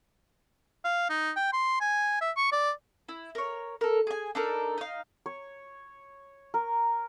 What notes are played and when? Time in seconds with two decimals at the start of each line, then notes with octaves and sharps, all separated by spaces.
0.84 F5
1.10 D#4
1.36 G5
1.53 C6
1.81 G#5
2.21 E5
2.36 C#6
2.52 D5
3.09 E4
3.35 A#4 C#5
3.81 A4 A#4
4.07 G#4 G#5
4.35 D4 D#4 A4 A#4
4.78 D#4 F5
5.26 C#5
6.54 A#4